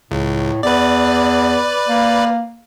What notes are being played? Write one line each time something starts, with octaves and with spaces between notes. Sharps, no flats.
C#2 A2
E2 B4 D5
A#3